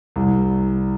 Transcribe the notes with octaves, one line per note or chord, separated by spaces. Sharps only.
C2